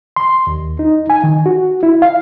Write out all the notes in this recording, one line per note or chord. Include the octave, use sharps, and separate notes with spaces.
C6
D#2
D#4
G#5
D#3
F#4
E4
F5